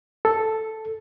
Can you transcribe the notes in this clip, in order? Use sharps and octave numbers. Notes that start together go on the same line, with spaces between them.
A4